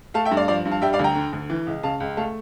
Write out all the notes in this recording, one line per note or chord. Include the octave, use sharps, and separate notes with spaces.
A3 F5 A5
E5 G5
G2
D5 F5
F3 D5 F5
G2
F5 A5
G3 E5 G5
D5 F5
D2
G5 A#5
D3
D2
E3
C#2
C#3 F5 A5
C#2
A3 F5 A5